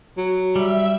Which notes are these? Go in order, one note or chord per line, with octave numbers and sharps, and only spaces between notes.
F#3
G3 E5